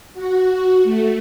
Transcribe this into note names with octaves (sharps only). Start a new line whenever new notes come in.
F#4
A3